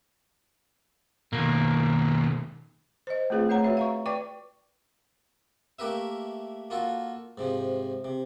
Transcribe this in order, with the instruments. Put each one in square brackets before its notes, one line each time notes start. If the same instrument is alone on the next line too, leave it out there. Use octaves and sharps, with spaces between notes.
[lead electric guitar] B2 D#3 [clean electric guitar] A#3
[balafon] C5 D#5
A3 C4 F4 G#4 B4 F5
A3 C#5 F#5 A#5
F#4 B4 C#5 E5
F5 A#5 C#6
B4 D5 G5 C#6 D6
[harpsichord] A3 A#3 G4 A#4 B4 E5
A#3 F4 F#4 A4
G#2 C3 F3
C3